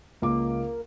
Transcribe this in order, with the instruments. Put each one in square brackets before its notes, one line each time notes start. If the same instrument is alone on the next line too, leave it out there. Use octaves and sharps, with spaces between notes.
[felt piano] C#2 D6 [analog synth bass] A#3